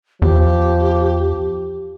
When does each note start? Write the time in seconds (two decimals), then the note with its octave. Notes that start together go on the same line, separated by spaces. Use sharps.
0.22 E2 F3 G4